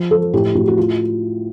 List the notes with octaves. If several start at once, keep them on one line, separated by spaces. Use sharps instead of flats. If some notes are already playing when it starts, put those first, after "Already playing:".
Already playing: F3
F3 A4
A2 G4
A2 F#4
F#4
F4